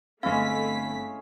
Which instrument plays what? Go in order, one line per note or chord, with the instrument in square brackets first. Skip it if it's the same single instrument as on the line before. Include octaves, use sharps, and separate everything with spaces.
[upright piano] G1 C4 [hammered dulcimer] G#3 C#4 E4 [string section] A3 B6 [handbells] F5